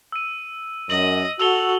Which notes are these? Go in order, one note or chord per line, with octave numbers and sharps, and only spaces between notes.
E6 D#7
F#2 D#5 F#7
F#4 A4 E6 F7 G7